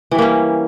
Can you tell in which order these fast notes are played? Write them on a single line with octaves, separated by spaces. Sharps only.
E3 G3 A#3 C#4